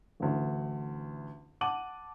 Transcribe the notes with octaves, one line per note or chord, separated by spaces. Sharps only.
A1 D2
F#5 A5 D6 D#7 F#7